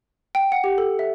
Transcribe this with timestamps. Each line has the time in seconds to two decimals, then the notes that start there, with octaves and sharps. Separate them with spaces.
0.35 G5
0.52 F#5
0.64 G4
0.78 A4
0.99 E5